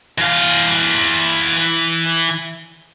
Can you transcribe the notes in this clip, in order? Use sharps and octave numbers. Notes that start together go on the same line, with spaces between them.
E3 F5